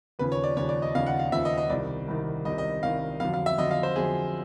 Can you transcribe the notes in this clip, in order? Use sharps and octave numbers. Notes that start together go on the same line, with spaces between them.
D#2 C#3 F3 B4
C#5
D5
D#2 C#3 F3 C#5
D5
D#5
D#2 C#3 F3 F5
F#5
F5
D#2 C#3 F3 E5
D#5
D#5
C2 C3 D#3 D5
C2 C3 D#3
C2 C3 D#3 D#5
D#5
C2 C3 D#3 F5
F2 D3 F#3 F5
F5
E5
F2 D3 F#3 D#5
F5
C5
F2 D3 F#3 G#4